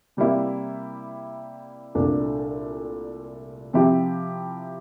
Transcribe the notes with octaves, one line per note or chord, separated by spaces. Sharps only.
C3 G3 A#3 E4
C2 A#2 A3 D4 A4
C3 F3 C4 E4 G4